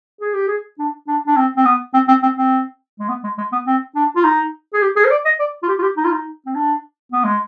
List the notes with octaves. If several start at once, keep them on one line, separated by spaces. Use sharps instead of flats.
G#4
G4
G#4
D4
D4
D4
C4
C4
B3
C4
C4
C4
C4
G#3
B3
G#3
G#3
B3
C4
D4
F4
D#4
G#4
G4
G#4
C5
D5
D#5
D5
F4
G4
F4
G4
D#4
F4
D#4
C4
D4
B3
G#3